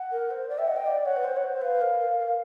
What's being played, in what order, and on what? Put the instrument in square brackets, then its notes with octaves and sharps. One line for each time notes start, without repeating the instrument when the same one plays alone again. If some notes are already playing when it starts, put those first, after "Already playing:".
Already playing: [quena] F#5
[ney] A#4
C5
D5
[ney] E5 [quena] G5
[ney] D#5 [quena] F#5
[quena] G5
[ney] D5
[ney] C#5 [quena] F#5
[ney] B4
C5
C#5
C5
[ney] B4 [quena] F5
[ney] A#4
A#4
A#4